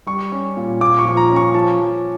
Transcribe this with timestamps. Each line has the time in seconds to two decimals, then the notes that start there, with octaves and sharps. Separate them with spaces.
0.07 G3 C#6
0.32 C#4
0.57 A#2
0.81 A#2 D6
0.99 C#6
1.05 F3
1.17 A#5
1.30 C#4
1.36 C#6
1.54 F3 A5
1.80 F3